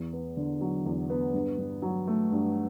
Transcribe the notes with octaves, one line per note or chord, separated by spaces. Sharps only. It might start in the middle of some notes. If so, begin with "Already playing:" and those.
Already playing: E2
B3
D3
F#3
E2
B3
G2
G2
F#3
A3
G2